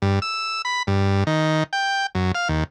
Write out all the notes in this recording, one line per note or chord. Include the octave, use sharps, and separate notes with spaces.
G2
E6
B5
G2
D#3
G5
F#2
F5
D#2